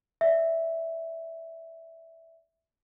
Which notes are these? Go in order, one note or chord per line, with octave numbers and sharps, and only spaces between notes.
D5 E5